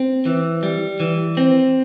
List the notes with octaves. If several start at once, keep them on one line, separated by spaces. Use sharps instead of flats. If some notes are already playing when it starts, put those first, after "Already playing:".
Already playing: C4
E3
G3
E3
C4